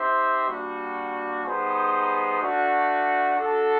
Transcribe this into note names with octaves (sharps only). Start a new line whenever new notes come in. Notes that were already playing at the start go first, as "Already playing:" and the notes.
Already playing: C4 D#4 G4 C5 E5
G3 A#3 D4 F#4
G3 B3 D#4 G#4 C5
A3 D4 F#4
D4 F#4 A4